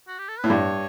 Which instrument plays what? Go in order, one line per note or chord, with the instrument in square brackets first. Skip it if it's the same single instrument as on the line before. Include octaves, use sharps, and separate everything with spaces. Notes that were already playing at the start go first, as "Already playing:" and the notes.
[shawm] F#4
G4
A4
[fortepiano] A2 [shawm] B4
[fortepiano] G2 [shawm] C#5